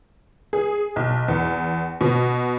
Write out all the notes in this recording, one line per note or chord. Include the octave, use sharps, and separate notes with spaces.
G#4
B1
E2
B2